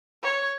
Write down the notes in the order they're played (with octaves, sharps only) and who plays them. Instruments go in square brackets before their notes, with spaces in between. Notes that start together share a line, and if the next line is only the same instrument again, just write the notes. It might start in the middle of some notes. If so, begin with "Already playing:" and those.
[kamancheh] C#5